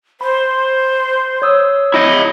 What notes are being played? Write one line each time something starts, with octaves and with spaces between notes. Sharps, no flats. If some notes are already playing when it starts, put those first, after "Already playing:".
C5 B5
C#5 D#6 E6
E4 D#5